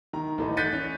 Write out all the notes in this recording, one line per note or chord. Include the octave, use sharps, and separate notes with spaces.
D#3 A#5
A1 A3 D#4
F#6 G6 A6 B6 C#7 D#7
C#4